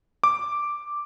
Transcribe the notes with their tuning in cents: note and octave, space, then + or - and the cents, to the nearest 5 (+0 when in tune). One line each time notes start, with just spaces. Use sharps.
D6 +0